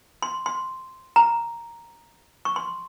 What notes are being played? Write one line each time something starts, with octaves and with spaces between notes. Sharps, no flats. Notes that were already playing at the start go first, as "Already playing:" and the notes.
C6
C6
A#5
C#6
C6